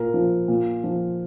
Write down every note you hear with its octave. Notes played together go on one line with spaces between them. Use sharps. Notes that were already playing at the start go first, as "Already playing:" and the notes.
Already playing: A#2 A#4
F3
A#2
F3